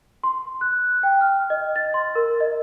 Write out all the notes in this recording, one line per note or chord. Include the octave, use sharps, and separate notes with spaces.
C6
F#6
G5
F6
D#5
A6
C6
A#4
D#5